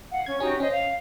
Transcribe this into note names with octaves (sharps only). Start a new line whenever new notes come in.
F5 F#5
C#4 G#6
C#4 D#4 F#4 G4
C#4 C5 D#5
F5